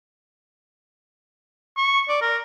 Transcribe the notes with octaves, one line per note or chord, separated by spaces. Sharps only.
C#6
D5
A#4